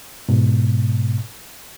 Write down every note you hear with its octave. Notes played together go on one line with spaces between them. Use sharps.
G#2 B2